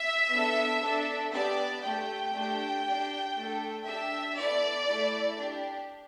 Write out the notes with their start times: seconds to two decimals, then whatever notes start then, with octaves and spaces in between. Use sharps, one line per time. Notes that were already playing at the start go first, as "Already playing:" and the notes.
Already playing: E5
0.31 B3 D4 A4
0.81 D4 A4
1.32 B3 D4 G4 D5
1.83 A3 G4 G5
2.34 A3 D4 G4
2.85 D4 G4
3.35 A3 D4 A4
3.86 D4 G4 E5
4.36 B3 E4 A4 D5
4.87 A3 E4 A4
5.38 D4 G4